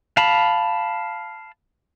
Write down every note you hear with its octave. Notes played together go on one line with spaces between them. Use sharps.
F5 A5 B5